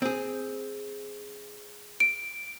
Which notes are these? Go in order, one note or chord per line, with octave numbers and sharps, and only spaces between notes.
C4 G#4
D7